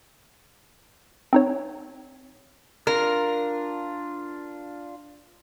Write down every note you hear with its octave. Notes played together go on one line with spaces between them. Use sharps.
C4 D#4 C#5
D4 F4 A#4